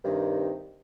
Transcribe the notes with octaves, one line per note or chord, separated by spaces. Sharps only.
G2 C3 D#3